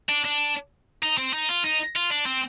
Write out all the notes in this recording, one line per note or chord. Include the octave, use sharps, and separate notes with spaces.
D4
D4
D#4
C4
D#4
F4
D#4
F4
D4
C4